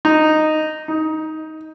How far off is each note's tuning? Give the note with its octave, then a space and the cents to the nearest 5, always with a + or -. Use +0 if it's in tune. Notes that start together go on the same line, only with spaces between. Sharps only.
D#4 -5
D#4 +15